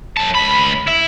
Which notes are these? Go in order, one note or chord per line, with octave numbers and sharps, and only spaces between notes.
F#2 A5
C#2 B5
E4